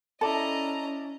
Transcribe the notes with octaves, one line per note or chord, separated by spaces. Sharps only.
C#4 E4 A4 D5 D#5 A5 A#5